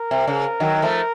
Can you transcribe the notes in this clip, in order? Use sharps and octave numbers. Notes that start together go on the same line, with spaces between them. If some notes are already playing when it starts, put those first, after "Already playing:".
Already playing: A#4
C3
C#3
D#3 F#3
F3 A3